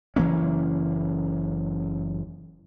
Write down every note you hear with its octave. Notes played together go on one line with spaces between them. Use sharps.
F#1 E3 A#3 C#4